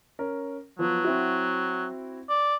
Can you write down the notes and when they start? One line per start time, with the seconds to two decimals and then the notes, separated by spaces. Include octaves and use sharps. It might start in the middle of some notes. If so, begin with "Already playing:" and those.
0.19 C#4 A#4
0.79 F3 F#3 B3
1.04 C4 E4 F#4
2.29 D5